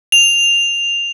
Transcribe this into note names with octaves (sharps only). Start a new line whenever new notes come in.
F7